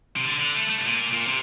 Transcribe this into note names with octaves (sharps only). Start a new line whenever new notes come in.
C3
D3
D3
A3
A3
C3
A#2
A#2
C3